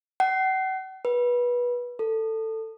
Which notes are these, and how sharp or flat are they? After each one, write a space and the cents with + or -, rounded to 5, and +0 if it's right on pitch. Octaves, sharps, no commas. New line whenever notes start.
F#5 +40
B4 -25
A4 +15